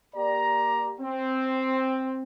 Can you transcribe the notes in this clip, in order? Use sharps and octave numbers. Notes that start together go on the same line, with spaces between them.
A#3 G4 D5 A#5
C4